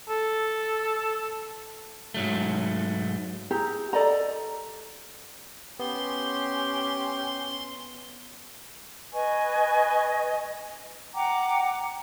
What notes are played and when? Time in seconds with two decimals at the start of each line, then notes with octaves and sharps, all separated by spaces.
0.09 A4
2.14 G#2 F#3 A3
3.51 E4 G4 G#4 A#5
3.93 A4 D5 D#5 A#5
5.80 B3 C#4 G4 C6
9.12 B4 D#5 G#5 C#6
11.14 F#5 G5 A#5 D6